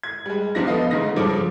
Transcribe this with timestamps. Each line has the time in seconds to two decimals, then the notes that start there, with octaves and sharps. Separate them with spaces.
0.03 G#6
0.26 G3 G#3
0.55 E2 F3 D4 A#6
0.67 B3 A4 D#5 F5
0.91 G#2 C#3 E3 A3 D#4 A#6
1.16 G2 C#3 F3 A4 D6 D7